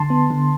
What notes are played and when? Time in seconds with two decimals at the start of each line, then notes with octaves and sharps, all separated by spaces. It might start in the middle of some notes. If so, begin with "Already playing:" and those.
Already playing: D3 A5 C6
0.10 B3
0.30 D3